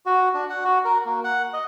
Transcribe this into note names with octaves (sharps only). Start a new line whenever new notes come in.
F#4
D4
F#5
F#4
A#4
A#3
F#5
D#5